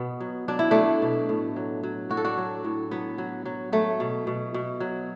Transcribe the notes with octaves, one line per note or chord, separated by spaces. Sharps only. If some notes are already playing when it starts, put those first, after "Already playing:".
Already playing: B2 B3
F#3
F#3 D4
E4
F#3 A3 D4
B2
A2
F#3
F#3
A2 F#4
A4
D4 F#4
F#3
A2
F#3 B3
F#3
F#3
F#3 A3
B2
B2
B2
F#3